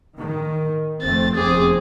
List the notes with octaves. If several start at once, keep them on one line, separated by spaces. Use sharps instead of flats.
D#3
F1 A3 C4 A6
F1 E2 C4 G#4 D6